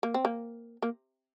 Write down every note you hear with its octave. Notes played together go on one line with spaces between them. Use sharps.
A#3
C4
A#3
A#3